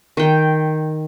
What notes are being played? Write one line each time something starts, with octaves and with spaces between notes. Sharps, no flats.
D#3 G5